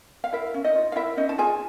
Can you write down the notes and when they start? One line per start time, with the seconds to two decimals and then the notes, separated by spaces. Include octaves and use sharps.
0.24 F5
0.33 E4 A#4 E5
0.54 C#4
0.64 D#4 D#5
0.75 F4
0.92 F5
0.96 E4 A#4 E5
1.17 C#4 D#4 D#5
1.29 A5
1.38 F4 G#4 G#5